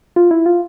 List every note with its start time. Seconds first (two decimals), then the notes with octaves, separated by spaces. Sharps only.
0.16 F4
0.31 E4
0.46 F4